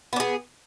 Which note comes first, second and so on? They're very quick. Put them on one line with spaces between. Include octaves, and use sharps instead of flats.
B3 D4 G#4